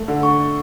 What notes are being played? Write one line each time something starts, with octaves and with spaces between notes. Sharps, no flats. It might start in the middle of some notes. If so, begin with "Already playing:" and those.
Already playing: A3
D3
C#6